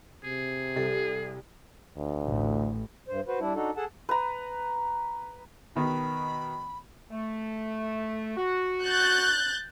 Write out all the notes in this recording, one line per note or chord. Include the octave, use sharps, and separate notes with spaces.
C3 G#4
C2 G4 A4
D2
A1
G2 C5
F#4 B4 C5
G3 D4 E4
D4 D#4 F#4 A4
G#4 A4 F#5 A5
B4 A#5
B2 D#3 B3 B5
A3
F#4
F#6 G6 A6